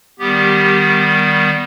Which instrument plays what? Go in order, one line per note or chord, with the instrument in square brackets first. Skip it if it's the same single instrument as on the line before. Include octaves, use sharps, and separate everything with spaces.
[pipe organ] D#3 G3 B3 G4